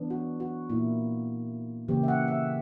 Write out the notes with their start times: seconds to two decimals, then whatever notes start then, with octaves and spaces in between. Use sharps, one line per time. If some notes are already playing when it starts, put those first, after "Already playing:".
Already playing: E3 B3 D4
0.10 F#4
0.40 F#4
0.70 A#2 A#3 E4
1.88 C#3 E3 A#3 G4
2.03 E5
2.08 F#5
2.28 E5